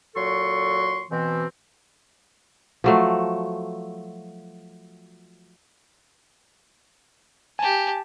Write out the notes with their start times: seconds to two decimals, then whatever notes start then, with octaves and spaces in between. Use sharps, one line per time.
0.15 A#2 F#3 A4 C6 C#6
1.11 B2 E3 C4
2.84 F3 F#3 A3
7.59 G4 G#5 A5